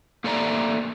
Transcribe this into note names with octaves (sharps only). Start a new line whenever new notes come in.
A#3 G4 A4 D5 E5 A#5